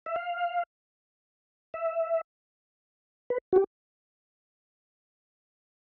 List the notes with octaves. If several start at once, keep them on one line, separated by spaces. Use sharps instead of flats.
E5
F5
E5
B4
F#4
G4